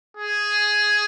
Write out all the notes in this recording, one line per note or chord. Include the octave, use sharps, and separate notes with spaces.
G#4